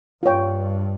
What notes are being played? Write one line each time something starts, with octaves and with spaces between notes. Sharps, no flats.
G2 F4 C#5 G5